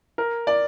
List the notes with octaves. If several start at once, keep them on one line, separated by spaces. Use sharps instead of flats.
A#4
D5